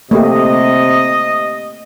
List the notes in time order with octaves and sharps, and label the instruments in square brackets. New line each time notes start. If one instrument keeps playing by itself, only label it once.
[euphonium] C3 [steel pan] A3 A#3 G4 [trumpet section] D#5